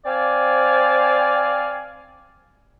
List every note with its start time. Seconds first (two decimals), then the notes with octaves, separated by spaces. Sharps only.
0.06 C4 D5 F5 G#5